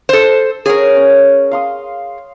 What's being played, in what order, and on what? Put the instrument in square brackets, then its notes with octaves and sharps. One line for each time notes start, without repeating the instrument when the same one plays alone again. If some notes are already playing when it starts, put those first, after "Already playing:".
[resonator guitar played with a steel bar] A4 C5
[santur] C#4 C#5 F#5 [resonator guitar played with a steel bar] G#4 A#4
[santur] C#4
F5 C6 D#6